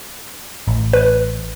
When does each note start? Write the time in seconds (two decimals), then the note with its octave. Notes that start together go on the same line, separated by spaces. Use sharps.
0.68 A1
0.93 B4